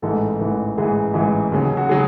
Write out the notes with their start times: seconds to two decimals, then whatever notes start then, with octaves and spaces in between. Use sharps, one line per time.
0.02 A1 G#2 E3 A4
0.40 A1 G#2 E3
0.78 A1 G#2 E3 G#4
1.14 A1 G#2 E3 G#4
1.52 D#2 C#3 F#3
1.77 F#4
1.89 C#3 F#3 G#4